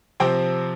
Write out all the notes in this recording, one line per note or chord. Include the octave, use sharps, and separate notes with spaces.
C3 F3 C4 G5